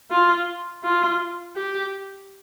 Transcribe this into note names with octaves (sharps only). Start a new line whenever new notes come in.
F4
F4
G4